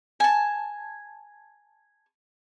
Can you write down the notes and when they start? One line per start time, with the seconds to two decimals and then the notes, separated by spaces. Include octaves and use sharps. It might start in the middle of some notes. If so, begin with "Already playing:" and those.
0.20 G#5 A5